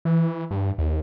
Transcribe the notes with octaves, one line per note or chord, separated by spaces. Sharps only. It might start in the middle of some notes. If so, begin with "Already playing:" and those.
E3
G2
D#2